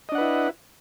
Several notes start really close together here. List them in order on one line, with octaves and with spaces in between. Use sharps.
D#5 D4 F#5 B4 E4